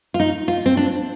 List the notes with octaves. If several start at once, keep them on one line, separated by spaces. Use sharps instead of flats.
F4
D#4
F4
C4
D4